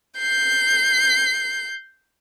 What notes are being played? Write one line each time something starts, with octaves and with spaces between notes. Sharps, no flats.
G6 C7